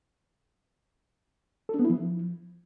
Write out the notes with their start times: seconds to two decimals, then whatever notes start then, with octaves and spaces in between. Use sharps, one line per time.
1.69 A4
1.74 D4
1.79 B3
1.85 E4
1.90 F3